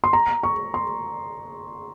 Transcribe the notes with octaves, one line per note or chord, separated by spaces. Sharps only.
C6
A#5
C#6
C6